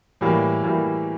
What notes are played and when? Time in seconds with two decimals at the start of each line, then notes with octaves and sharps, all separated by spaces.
0.21 A2 E3 G3 A#3
0.63 A2 E3 G3 A#3